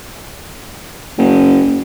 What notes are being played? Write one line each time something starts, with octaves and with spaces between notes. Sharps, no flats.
F#1